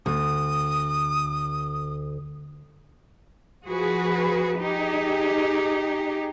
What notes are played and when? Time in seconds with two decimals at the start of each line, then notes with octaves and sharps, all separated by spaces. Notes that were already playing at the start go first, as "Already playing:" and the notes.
0.06 D2 D#6
3.66 F3 F#4 G#4 B4
4.59 D#4 G4 G#4